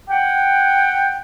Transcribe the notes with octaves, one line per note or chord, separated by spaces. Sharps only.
F#5 G5